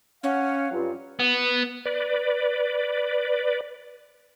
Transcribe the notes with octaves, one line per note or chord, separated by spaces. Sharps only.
C#4 F5 F#5
G2 F#3 F4
B3
B4 D5